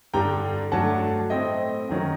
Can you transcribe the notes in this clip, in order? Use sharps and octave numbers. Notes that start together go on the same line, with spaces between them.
G2 D3 G3 D4 G5 A#5
G2 F#3 A3 D4 F#5 A5
A2 A3 C4 D#5 G5
F#2 D#3 F#3